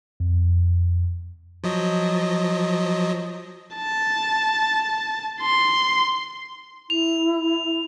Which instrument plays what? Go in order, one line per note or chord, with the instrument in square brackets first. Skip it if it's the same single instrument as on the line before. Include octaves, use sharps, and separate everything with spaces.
[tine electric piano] F2
[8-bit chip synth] F3 F#3 D#5
[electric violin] A5
C6
[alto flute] E4 [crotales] F7